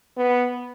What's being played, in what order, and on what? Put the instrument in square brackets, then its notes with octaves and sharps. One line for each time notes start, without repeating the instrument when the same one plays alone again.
[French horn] B3